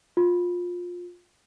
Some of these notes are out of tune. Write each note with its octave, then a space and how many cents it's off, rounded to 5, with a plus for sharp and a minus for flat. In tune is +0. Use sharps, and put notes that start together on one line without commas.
F4 +20